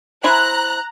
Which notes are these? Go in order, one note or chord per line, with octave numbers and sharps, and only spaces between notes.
E4 C5 G#5 A#5 F#6